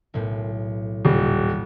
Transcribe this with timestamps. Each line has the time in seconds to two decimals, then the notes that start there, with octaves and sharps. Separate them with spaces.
0.14 B1 A2
1.05 D#1